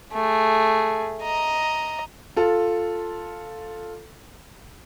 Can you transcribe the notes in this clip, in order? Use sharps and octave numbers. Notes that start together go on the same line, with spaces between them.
A3 G#4
D#5 A#5
F4 A4